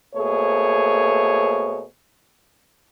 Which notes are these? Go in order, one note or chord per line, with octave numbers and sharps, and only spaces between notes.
B2 A3 A#3 G#4 C5 C#5